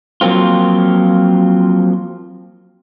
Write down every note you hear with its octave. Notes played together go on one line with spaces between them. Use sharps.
F3 F#3 A#3 C4 F4